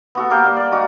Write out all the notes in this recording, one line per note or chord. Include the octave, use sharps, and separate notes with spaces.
B3 F#4 A4
A#3 G4 F5 G5
G3 A#3
D5
G#3 F#4